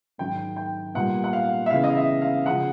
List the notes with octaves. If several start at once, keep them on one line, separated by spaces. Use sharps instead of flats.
G#2 D#3 F#3 G5
G5
A#2 G3 B3 F#5
F#5
F5
E5
C#3 E3 G#3 B3 F5
D#5
E5
F5
C#3 F3 G#3 F#5